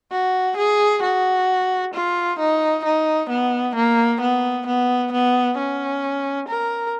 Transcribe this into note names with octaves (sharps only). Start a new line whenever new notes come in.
F#4
G#4
F#4
F4
D#4
D#4
B3
A#3
B3
B3
B3
C#4
A#4